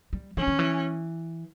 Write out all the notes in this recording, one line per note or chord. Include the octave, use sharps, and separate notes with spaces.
G3
E3 C#4
D#3
E3